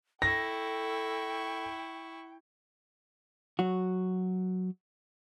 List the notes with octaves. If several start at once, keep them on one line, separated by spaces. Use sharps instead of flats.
E4 A4 G5 C#6 A#6
F#3 F#4